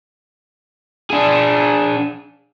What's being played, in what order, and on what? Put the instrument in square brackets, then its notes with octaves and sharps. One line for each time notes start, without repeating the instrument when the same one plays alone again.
[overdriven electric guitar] D4 G#4